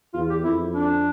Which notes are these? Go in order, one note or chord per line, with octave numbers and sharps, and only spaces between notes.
E2 F4
G4
F2 E4
D4